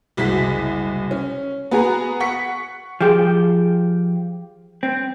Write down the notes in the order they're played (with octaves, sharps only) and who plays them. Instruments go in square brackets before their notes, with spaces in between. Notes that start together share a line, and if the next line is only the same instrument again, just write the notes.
[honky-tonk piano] F#1 C2 G#3 F#4 B6
C#4
B3 F#4 G#4 G#5 A#5
F#5 C#6 B6 C#7
[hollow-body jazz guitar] F3 G4 [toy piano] G#4 G#5
[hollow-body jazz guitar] C4